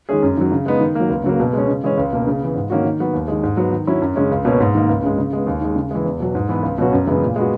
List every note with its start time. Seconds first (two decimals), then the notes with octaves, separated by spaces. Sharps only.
0.09 D#3 G#3 C#4 G#4
0.23 F#2
0.37 D#3 F#3
0.52 C#3
0.66 G#3 B3 D#4
0.81 D#3
0.95 F#3 A#3
1.10 C#2
1.24 C#3 F#3 A#3
1.39 B2
1.53 G#3 C#4
1.68 C#3
1.83 E3 G#3 C#4
1.98 C#2
2.13 B2 A#3
2.27 C#3
2.41 E3 B3
2.55 G#2
2.70 D#3 A#3 C#4 F#4
2.85 D#3
3.00 F#3 B3 F#4
3.13 D#2
3.28 D#3 G#3
3.43 G#2
3.57 F#3 B3
3.73 D#3
3.87 F#3 C#4 E4
4.02 F#2
4.16 C#3 G#3 C#4
4.31 C#2
4.45 B2 A#3 C#4
4.60 G#2
4.75 D#3 A#3
4.89 C#2
5.03 C#3 G#3
5.18 C#3
5.33 G#3 B3
5.46 D#2
5.61 D#3 G#3
5.76 C#3
5.91 E3 G#3
6.05 E2
6.20 B2 F#3
6.35 G#2
6.49 E3 B3
6.63 C#2
6.78 B2 F#3 C#4 F#4
6.93 F#2
7.07 C#3 E3 G#3 B3
7.22 A#2
7.36 G#3 B3 F#4